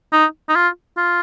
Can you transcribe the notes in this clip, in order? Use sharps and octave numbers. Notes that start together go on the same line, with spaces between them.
D#4
D#4
F4
F4